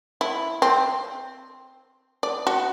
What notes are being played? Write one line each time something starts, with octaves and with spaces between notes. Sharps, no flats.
E4
C4
D5
F#4